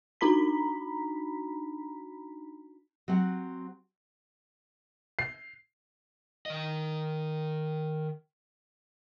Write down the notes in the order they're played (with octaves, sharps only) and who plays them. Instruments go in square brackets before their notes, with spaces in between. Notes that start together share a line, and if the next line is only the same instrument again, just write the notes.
[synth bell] D4 D#4 F#4 A#5 B5 B6
[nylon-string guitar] F#3 C4 F#5
[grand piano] C7
[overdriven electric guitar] D#3 D#5